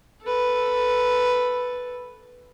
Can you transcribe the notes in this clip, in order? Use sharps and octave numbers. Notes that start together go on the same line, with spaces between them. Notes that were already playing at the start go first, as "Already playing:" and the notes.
A4 B4